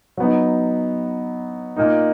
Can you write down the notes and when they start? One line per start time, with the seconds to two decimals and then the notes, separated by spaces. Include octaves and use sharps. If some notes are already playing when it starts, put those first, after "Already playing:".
0.17 F#3 B3 D#4
1.76 A#2 A#3 D#4